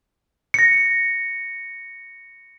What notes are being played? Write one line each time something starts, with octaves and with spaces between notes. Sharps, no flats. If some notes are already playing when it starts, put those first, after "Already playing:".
A#6 C#7